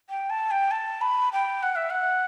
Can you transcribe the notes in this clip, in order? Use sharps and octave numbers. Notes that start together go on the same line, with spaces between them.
G5
A5
G5
A5
B5
G5
F#5
E5
F#5